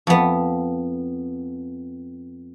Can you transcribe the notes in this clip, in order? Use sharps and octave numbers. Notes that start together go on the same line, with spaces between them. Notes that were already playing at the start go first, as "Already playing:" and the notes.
F2 B3